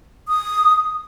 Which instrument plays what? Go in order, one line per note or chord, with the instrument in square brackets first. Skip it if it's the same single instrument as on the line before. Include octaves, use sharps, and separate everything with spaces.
[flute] D#6